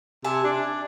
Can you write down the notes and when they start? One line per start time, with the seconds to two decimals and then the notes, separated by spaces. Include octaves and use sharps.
0.24 C3 E5 G#5 A5
0.44 D4